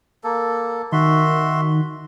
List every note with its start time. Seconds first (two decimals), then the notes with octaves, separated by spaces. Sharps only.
0.24 A#3 A4
0.92 D#3 F#4 E5 C6